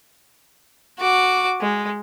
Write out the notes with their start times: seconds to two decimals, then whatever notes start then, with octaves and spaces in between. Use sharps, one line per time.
0.99 F#4 D6
1.62 G#3